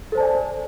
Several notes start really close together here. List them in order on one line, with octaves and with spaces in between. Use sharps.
A4 C5 A5 D5 G#5